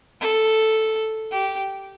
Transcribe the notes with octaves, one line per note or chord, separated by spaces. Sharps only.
A4
G4